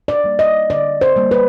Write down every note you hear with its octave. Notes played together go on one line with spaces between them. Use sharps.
D5
G3 A#3
D#5
D3 D5
C5
G3 A#3
B4